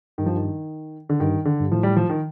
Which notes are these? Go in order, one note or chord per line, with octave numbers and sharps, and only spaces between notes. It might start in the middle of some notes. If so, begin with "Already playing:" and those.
G2 D#3
F3
D#3
D3
G2 D#3
D3
G2
A2 F3
G3
F3
D#3